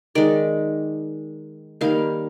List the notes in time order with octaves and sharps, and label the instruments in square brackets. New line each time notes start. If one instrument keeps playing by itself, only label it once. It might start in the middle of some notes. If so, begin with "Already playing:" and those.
[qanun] D#3 G#3 D5
D#3 G3 A#3 F5